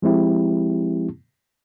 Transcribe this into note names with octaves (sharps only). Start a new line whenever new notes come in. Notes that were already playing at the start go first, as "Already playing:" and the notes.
F3 G#3 C4 E4 G4